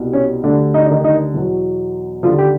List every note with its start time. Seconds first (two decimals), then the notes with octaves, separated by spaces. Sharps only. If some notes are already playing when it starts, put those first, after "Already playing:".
Already playing: C2 B2 G3
0.13 C#4
0.44 D2 D3 G3 D4
0.74 D#4
0.83 D4
0.91 D#3 D#4
1.04 D#3 D#4
1.34 E2 B2 F#3
2.23 D#2 D3 F3 G3 F4
2.38 G4